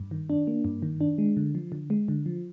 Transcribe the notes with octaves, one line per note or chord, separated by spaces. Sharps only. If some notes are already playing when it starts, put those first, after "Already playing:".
Already playing: G2
D#3
D4
A#3
G2
D#3
D4
G#3
D3
F3
D3
G#3
D3
F3